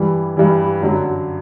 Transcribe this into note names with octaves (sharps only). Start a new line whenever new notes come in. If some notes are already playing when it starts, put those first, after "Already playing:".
Already playing: G2 E3 G3
G2 E3 G3
F#2 D3 F#3